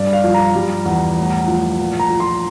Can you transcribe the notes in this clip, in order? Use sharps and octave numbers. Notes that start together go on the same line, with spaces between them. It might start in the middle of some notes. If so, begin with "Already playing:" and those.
Already playing: G2 D5
F5
F3
A#5
G3
E2
A2
F3
A#2
A#5
F3
C6